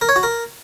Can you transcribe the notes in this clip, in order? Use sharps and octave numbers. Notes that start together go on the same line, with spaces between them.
A#4
C#5
F#4
A#4